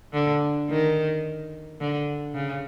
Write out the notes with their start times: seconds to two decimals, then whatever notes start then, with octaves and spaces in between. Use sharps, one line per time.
0.13 D3
0.70 D#3
1.80 D3
2.34 C#3